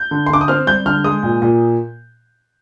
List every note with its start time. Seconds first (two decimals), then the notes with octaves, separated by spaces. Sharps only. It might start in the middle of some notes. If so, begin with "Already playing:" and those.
Already playing: G6
0.11 D3
0.26 C6
0.30 D3 D6
0.41 D#6
0.48 C4 F6
0.67 G3 G6
0.86 D3 F6
1.04 G#3 D#6
1.23 A#2
1.42 A#2